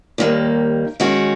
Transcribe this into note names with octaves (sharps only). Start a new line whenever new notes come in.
D#2 D#3 G3 A#3
D#3 G#3 C#4 F#4